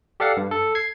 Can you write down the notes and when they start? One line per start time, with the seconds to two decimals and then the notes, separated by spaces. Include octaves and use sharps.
0.20 G4 A4 D5 F5 F#5
0.37 G2
0.51 A4
0.75 G#6 C7